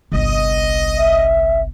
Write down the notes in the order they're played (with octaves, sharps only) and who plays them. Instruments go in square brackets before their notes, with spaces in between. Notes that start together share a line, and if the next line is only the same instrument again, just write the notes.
[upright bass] G1 C2 [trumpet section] D#5
[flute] E5